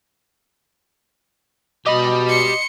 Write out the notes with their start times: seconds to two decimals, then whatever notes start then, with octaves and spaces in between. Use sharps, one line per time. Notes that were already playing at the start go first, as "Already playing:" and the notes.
1.86 B2 G4 D#5 B5
2.29 C6 C#7